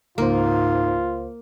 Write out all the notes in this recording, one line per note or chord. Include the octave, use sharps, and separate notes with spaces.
C#2 G#2 A#3 F4 C5